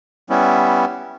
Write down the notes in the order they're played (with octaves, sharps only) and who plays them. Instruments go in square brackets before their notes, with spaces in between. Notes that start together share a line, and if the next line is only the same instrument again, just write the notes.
[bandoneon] G3 B3 C#4 E4